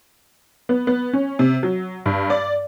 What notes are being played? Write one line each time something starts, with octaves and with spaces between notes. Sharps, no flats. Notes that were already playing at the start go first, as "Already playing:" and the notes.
B3
B3
C#4
C3
F#3
G2
D5